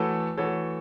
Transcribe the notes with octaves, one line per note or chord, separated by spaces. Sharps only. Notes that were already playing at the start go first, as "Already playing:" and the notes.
Already playing: E3 A3 F#4 A4 C#5
E3 A3 F#4 A4 C#5